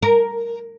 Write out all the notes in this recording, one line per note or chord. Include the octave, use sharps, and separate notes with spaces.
A#4